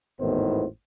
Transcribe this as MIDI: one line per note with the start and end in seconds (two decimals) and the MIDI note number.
0.20 0.65 32
0.20 0.65 40
0.20 0.65 45
0.20 0.65 51
0.20 0.65 59
0.20 0.65 72